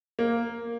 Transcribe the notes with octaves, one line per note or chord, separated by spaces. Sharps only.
A#3